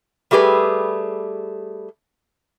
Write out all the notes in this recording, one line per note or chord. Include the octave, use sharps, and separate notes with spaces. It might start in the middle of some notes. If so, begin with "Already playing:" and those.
G3 A3 G4 G#4 B4